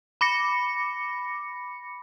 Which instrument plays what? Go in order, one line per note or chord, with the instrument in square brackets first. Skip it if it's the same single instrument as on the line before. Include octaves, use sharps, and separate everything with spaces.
[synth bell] B5 D6 A#6 C#7